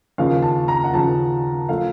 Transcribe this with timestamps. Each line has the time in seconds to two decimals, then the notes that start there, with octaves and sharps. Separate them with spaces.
0.18 D#2 C#3 F3 F5
0.42 A5
0.68 A#5
0.84 F#5
0.93 D#2 C#3 F3 A5
1.69 F3 A3 F5